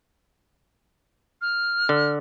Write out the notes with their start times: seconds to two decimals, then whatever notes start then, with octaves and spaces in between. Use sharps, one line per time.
1.42 F6
1.89 D3